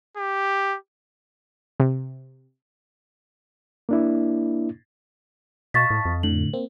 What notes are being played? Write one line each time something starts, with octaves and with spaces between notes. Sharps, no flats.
G4
C3
A#3 D4 E4
B2 D#5 F5 A5 C#6 A6 B6
A2
F2
A2 D3 F#7
A#3 C4